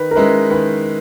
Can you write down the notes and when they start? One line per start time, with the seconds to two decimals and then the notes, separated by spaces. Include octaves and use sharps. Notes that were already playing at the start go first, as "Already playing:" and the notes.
Already playing: D#3 B4
0.11 A#4
0.16 G#3 C#4 E4 B4
0.50 D#3 B4